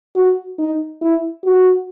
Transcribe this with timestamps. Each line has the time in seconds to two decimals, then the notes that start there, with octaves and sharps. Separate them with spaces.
0.16 F#4
0.59 D#4
1.01 E4
1.45 F#4